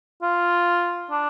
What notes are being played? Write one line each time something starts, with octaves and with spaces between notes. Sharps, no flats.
F4
D4